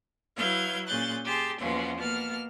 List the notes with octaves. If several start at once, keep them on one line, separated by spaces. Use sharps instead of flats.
F#3 E4 B4 F5 G6 G#6
A#2 C#4 G#4 F#6 G6 A6
G4 G#4 A5 C6
E2 B2 F3 A#3 C#4 C6
B2 A#3 A5 F6